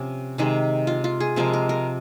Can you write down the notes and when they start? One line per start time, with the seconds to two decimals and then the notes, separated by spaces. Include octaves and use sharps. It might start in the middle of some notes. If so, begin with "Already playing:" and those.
Already playing: C3 F3 C#4
0.38 C3 D#3 G#3
0.87 F4
1.04 F4
1.20 G#4
1.36 C3 F3 G#3 A#4
1.53 A#4
1.69 A#4